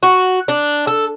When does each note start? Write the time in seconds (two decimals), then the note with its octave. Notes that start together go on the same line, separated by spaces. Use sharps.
0.03 F#4
0.48 D4
0.87 A4